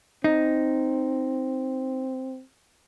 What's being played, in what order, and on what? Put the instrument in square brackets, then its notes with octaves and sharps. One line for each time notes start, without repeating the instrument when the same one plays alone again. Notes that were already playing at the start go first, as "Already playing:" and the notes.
[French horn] C4 [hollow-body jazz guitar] D#4